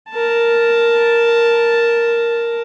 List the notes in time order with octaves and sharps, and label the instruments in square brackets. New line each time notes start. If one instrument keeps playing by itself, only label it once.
[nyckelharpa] A#4 A5